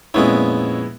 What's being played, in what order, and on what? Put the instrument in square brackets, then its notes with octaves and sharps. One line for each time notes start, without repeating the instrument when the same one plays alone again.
[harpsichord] F2 A#2 C#4 [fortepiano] G#3 B3 E4